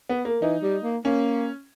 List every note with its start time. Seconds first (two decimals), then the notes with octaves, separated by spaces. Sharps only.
0.09 B3
0.25 A#3
0.42 E3 D#4
0.62 G3
0.83 A#3
1.05 A#3 C#4